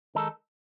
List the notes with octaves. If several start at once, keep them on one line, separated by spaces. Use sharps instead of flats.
D#3 G#3 D#4 A4